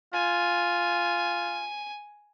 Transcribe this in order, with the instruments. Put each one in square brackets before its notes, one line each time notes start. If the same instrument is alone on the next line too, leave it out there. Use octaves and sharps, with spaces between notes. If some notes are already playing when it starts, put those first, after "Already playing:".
[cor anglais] F4 [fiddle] G#5